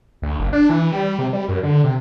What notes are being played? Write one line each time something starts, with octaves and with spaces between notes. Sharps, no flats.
D2
F#1
D4
E3
G3
C3
G3
F#2
D3
C3